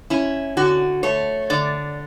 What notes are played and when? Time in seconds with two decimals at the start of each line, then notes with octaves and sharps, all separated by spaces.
0.10 C#4 E4
0.57 D3 F#4
1.03 A3 C#5
1.50 D3 D5